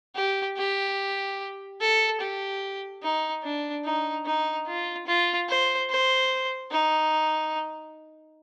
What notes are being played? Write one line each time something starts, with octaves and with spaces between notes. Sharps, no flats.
G4
G4
A4
G4
D#4
D4
D#4
D#4
F4
F4
C5
C5
D#4